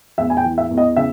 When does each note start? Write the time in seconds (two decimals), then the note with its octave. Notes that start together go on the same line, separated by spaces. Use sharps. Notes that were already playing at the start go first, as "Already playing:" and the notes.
0.18 E2 E5
0.30 G#5
0.37 G5
0.45 E3
0.58 E5
0.71 E2
0.78 D#5
0.96 C#3 E5